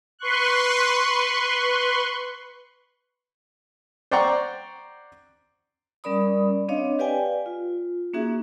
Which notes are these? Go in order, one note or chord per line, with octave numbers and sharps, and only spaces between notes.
B4 C6 C#6 F#6
C5 D5 F#5 G5 A#5 C#6
G3 C#4 A#4 D5 B5 D#6
C4 D4 C#5 D#5 F5
G4 B4 D5 F5 G5 G#5
F4
A#3 C#4 D#4 F#4 G#4 E5